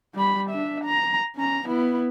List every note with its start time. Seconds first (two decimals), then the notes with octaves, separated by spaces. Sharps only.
0.14 G3 B5
0.50 D4 E5
0.85 A#5
1.35 C#4 A#5
1.67 B3 E4